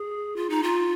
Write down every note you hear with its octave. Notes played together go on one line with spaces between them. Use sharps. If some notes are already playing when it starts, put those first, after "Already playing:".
Already playing: G#4
F4
D#4
F4